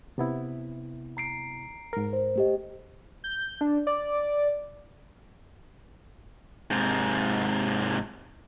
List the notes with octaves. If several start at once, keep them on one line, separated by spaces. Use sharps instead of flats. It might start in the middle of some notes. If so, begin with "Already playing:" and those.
C3 B3 E4
A#5 C7 D7
G#2 A#4
C5
A3 G4 D#5
G6
D4
D5
G#2 C3